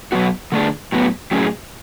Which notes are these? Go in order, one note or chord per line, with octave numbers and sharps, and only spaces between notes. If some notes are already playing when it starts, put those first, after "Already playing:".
B2 F#3 B3 F#4
D3 A3 D4 G#4
A2 F#3 B3
A2 F#3 C#4 G#4